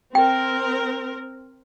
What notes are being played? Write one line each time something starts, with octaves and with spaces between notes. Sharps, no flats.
C4 A#4 G5